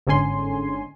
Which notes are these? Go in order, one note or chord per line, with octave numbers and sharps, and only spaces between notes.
G1 G#2 D3 C#4 G#5 C6